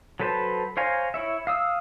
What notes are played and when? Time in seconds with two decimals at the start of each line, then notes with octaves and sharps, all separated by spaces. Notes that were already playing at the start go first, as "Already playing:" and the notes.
0.20 F#3 A4 B4 C5 A5
0.77 C5 C#5 F5 G#5 A#5
1.14 E4 C#5 E5
1.47 F5 D#6 E6